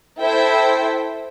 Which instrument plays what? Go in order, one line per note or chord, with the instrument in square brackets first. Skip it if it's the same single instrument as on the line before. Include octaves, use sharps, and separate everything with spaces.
[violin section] E4 A4 C5 E5 G5